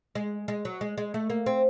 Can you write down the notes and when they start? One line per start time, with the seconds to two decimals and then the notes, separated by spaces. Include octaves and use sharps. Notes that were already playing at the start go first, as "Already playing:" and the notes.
0.15 G#3
0.48 G#3
0.65 F#3
0.81 G#3
0.98 G#3
1.14 A3
1.30 A#3
1.46 C4